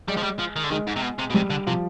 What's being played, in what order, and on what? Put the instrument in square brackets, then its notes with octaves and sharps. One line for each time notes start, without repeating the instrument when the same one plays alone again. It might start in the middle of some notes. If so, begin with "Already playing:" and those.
[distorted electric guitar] G3 [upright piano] G#3
[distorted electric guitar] F3
G3
F3
D#3
D3
[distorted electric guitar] D#3 [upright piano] G#3
[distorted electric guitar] G#2
C3
B2
C3
B2
[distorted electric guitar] C3 [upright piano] G3
[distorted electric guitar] D3
[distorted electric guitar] C3 [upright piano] F3